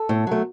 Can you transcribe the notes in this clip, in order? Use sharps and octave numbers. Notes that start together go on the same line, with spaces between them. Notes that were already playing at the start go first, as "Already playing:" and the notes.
Already playing: A4
A2
F#3 A3